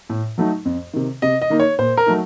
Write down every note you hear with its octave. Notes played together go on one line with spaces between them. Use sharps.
A2
F#3 A3 D#4
F2
C3 D#3
C3 D#5
D#5
D#3 A#3 D#4
C#5
A#2 C5
A#4
F#3 A3 D#4